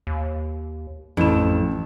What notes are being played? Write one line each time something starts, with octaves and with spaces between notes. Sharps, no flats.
D#2
A1 F2 E4 E7